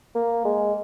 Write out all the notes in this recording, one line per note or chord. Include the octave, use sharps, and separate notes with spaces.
A#3
G#3